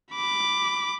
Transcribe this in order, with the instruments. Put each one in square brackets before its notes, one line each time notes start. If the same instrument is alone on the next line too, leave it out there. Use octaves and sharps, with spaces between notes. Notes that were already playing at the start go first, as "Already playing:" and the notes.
[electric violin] B5 D6